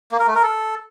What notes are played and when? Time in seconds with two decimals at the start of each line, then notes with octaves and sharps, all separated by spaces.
0.12 A#3
0.20 A#4
0.27 A3
0.35 A#4
0.43 A4